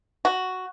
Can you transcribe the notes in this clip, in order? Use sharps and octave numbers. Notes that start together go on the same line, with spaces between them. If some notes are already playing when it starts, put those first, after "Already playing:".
F#4